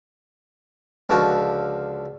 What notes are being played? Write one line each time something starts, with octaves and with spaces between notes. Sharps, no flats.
C#2 D3 F3 F#4